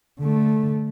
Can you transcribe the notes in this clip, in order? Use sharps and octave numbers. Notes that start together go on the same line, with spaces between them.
D3 A3